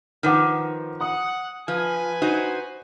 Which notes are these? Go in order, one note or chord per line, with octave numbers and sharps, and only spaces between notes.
D#3 F3 B4 F#5 D6
F#5 D#6
F3 B4 G#5
D#4 F#4 C5